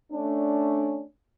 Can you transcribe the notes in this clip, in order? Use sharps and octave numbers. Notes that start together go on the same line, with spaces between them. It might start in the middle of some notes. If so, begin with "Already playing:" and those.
A3 C#4 D4